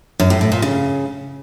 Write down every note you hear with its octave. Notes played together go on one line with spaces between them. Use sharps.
F#2
A2
A2
A#2
C#3